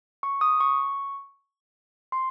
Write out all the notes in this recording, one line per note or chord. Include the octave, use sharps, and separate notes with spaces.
C#6
D#6
C#6
C6